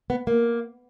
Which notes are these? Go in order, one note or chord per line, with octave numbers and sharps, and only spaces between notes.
B3
A#3